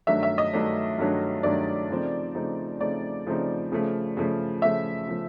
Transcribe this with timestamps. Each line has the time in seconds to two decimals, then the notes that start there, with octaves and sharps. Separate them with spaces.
0.07 G2 D#3 F#3 A3 D4 E5
0.23 E5
0.38 D#5
0.53 G2 D#3 F#3 A3 D4
0.98 G2 D#3 F#3 A3 D4
1.43 G2 D#3 F#3 A3 D4 D5
1.90 C#3 F3 A3 C4 D#4
2.35 C#3 F3 A3 C4 D#4
2.80 C#3 F3 A3 C4 D#4 D5
3.26 C#3 F3 A3 C4 D#4
3.72 C#3 F3 A3
4.17 C#3 F3 A3
4.62 C#3 F3 A3 E5
5.08 C#3 F3 A3